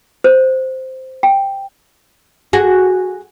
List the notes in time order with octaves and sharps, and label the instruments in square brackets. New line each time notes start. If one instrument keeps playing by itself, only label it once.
[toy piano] C5
G5
[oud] F#4 G#4